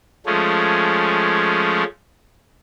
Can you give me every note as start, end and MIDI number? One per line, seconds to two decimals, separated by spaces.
0.26 1.84 53
0.26 1.84 56
0.26 1.84 57
0.26 1.84 61